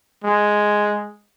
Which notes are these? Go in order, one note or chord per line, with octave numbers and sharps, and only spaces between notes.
G#3